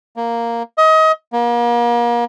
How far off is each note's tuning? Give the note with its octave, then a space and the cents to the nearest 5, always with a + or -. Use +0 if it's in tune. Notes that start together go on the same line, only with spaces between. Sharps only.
A#3 +0
D#5 +30
A#3 +35